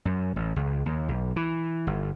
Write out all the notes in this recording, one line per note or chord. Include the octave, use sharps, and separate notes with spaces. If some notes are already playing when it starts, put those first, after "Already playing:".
F#2
A1
C#2
D#2
B1
E3
G1